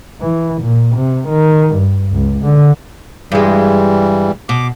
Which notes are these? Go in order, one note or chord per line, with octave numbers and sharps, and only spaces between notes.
E3
A#2
C3
D#3
G2
C#2
D3
G2 E3 G3 G#3
B2 D6